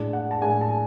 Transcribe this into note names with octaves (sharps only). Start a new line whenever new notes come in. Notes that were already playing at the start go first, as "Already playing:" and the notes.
Already playing: A2 G#3 D4
F#5
A5
A2 G#3 D4 G#5
A5